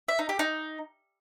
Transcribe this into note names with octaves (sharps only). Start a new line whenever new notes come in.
E5
D#4
G4
D#4